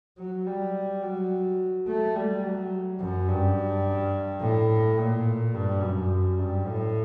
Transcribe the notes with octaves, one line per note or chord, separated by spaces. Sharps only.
F#3
G3
F#3
A3
G3
F#3
F#2
G2
A2
A#2
G2
F#2
G2
A2